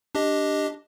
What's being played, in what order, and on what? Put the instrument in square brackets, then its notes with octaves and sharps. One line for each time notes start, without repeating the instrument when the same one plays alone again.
[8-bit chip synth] D4 G4 D#5